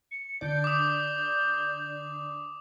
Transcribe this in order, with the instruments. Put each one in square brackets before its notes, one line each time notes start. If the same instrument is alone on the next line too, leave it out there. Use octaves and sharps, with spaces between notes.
[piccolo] C#7
[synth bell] D3 D4 D5 [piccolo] G6
[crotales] D6 D#6